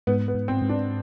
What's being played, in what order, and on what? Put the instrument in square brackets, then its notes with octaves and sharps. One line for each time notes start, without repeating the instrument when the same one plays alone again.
[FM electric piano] G#2 [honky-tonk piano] B3
[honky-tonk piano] B3
[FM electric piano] G#2
[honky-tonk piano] C4
[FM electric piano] G#2
[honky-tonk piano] D4